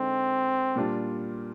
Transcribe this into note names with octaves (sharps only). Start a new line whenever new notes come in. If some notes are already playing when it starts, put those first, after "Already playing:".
Already playing: D3 G#3 C4 D#4
A#2 G3 D4 F4